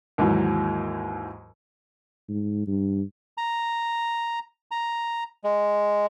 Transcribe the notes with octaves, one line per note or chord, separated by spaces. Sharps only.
D#2 G#2 E3 F#3
G#2
G2
A#5
A#5
G#3